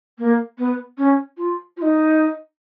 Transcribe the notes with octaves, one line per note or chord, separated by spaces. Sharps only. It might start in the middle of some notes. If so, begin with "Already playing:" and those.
A#3
B3
C#4
F4
F4
D#4